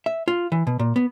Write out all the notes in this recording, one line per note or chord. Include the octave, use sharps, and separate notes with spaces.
E5
F4
E3
B2
A#2
B3